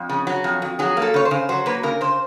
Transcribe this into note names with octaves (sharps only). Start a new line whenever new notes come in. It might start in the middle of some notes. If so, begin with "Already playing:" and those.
Already playing: F2
C#3
F#3
F2
F2
F#3 G#4
A#3 A4
C#3 C#5
C5
C#3
F#3 C5
A#3 B4
C#3 A#4
C#3 C5